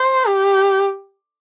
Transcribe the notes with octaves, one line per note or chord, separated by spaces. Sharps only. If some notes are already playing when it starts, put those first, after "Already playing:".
Already playing: C5
G4